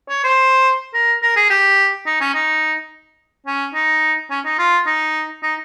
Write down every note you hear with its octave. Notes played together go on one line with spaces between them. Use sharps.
C#5
C5
A#4
A#4
G#4
G4
D#4
C#4
D#4
C#4
D#4
C#4
D#4
F4
D#4
D#4